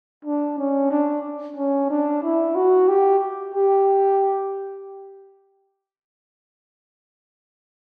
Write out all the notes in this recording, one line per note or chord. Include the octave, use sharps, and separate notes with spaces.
D4
C#4
D4
C#4
D4
E4
F#4
G4
G4